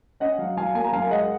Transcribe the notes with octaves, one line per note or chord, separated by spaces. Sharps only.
C#4 D#5 F#5
F#3 F5
F#3 F5 G#5
A#3 F5 G#5
A#5
F#2 F5 G#5
G#3 D#5 F#5